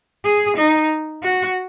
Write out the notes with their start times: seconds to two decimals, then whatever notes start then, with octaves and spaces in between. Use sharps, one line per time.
0.24 G#4
0.57 D#4
1.23 F#4